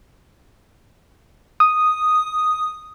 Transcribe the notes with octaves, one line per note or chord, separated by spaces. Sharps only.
D#6